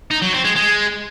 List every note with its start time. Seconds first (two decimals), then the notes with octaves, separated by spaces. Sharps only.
0.11 D#4
0.22 F#3
0.33 C4
0.44 G#3
0.56 G#3